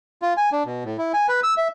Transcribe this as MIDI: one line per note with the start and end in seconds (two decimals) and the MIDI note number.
0.22 0.34 65
0.37 0.50 80
0.52 0.63 62
0.65 0.84 47
0.85 0.97 45
0.98 1.12 64
1.14 1.27 80
1.28 1.40 71
1.43 1.54 88
1.57 1.68 76